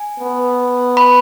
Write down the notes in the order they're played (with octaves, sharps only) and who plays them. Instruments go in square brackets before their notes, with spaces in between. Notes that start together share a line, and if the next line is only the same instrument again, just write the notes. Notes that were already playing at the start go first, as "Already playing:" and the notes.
Already playing: [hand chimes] G#5
[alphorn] B3
[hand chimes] B5